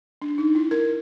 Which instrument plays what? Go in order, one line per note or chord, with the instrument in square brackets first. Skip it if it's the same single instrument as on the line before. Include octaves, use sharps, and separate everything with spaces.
[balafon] D4
D#4
E4
A#4